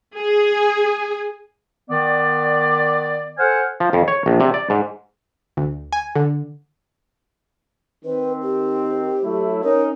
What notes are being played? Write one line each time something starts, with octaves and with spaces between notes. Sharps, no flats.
G#4 G#5
D#3 B3 D5
A4 C5 F#5 G#5 F6
F3
F2
C#5
A#1
C3
D5
G#2
D2
G#5
D3
D#3 C4 B4
G4
F#3 A3 E4
C#4 D#4 A#4